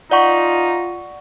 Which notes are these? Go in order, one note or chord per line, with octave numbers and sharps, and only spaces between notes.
D#4 F4 D5 F#5 C#6